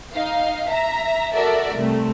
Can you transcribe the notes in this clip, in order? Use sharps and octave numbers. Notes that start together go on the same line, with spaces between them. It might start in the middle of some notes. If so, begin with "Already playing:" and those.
D#4 F5
E5 A#5
F#4 A4 A#4 D5 E5
C2 A3